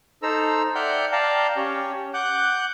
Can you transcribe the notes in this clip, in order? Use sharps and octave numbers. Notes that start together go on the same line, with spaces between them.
D#4 A4 C5 A#5 E6
D5 E5 F#5 G5 F6 G6
D5 F5 G5 A5 A#5
C#4 G4 C#5
F#5 D6 F#6 G6